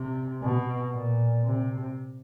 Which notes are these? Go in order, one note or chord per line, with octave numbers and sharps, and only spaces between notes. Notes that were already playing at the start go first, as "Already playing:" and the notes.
Already playing: C3
B2
A#2
C3